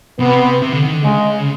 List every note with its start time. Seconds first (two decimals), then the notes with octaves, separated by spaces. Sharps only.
0.19 C3 B3
0.62 C3
0.72 D3
0.84 D#3
0.94 D3
1.04 C#3 G#3